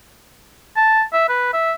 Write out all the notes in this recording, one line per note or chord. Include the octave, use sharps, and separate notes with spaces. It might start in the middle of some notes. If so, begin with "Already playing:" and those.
A5
E5
B4
E5